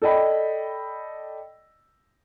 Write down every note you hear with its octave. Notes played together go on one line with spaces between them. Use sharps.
A4 D5 D#5 G5 B5